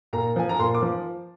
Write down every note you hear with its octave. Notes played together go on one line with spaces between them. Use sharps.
A#2 A#5
F3 G#5
A#5
A#2 C6
D6
F3